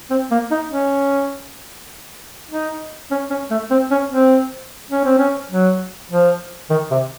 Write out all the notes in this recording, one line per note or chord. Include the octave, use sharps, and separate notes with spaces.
C4
A#3
D#4
C#4
D#4
C#4
C#4
A3
C4
C#4
C4
C#4
C4
C#4
F#3
F3
D#3
C3